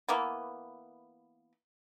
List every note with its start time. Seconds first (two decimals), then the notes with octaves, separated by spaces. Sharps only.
0.09 E3 A#3 B3